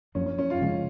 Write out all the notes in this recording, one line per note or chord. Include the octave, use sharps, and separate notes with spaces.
F#2 F3 A#3 C#4
C#4
C#4
F4
C#3 F3 G#3 C#4